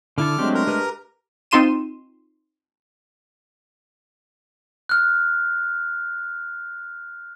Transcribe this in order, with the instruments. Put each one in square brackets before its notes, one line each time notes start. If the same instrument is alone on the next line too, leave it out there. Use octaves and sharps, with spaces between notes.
[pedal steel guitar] D3 E4 A4 [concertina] D6 F6
[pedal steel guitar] F#3 C4 G4 [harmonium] G#3 A3 D4
[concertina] A#4 A#5
[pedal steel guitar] G4 B4 F6
[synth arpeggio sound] C4 D#4 F4 C6 D#7 E7
[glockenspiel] F6 F#6